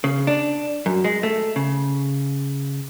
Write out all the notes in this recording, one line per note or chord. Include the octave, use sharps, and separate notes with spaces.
C#3
D4
F#2
G#3
A3
C#3